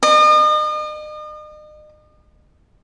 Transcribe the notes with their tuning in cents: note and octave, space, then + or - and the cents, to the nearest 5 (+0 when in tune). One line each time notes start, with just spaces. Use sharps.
D#5 -40